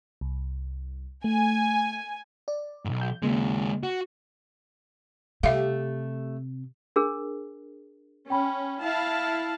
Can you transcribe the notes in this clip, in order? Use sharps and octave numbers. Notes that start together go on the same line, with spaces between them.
C2
A3 G#5
D5
B1 G#2
G6
D#2 C#3 G#3 A#3
F#4
C3 A3 G4 E5 F5
D4 G#4 A#4
C#4 G5 B5
E4 F5 A5